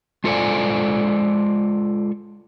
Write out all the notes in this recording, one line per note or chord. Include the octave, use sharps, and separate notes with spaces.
G#3 F4 A4 C5 D5 G#5